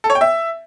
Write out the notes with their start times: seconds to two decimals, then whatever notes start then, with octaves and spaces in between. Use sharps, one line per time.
0.04 A4
0.10 C#5
0.15 G5
0.21 E5